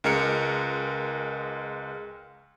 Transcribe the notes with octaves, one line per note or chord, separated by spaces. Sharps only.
C#2 G#3 A#4 C#7